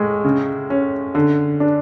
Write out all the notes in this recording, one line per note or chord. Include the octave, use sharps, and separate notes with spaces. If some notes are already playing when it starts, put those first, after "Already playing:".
Already playing: A2 G#3
C#3
C#4
D3
D4